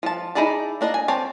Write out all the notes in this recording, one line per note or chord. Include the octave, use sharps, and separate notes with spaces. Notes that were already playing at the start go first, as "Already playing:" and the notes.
F3 A5
D#4 E4 G#4 D5 A5
A#3 D4 D5 D#5
G#5
C4 C#5 D5 A5